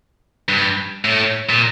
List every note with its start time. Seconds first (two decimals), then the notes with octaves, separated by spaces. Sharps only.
0.49 G2
1.05 A2
1.49 A#2